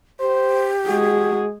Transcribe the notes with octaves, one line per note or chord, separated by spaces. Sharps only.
G4 C5
G#3 F#4 G#4